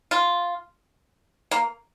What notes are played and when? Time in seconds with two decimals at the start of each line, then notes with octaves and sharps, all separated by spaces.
0.11 F4
1.51 A#3